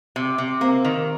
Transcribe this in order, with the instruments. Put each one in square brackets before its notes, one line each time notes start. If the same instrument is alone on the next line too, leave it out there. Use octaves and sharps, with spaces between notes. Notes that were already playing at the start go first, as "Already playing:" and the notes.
[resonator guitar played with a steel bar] C3
C3
[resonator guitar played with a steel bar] A#3 [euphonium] C4
[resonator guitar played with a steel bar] D#3